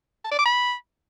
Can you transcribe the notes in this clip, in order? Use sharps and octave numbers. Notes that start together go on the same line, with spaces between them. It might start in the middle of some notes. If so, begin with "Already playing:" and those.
A5
D5
D6
B5